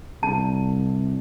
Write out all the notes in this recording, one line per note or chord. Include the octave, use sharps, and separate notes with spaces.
C2 A5